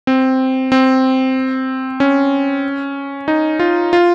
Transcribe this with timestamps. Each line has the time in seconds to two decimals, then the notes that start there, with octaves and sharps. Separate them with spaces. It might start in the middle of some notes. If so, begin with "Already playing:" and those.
0.07 C4
0.72 C4
2.00 C#4
3.28 D#4
3.59 F4
3.93 F4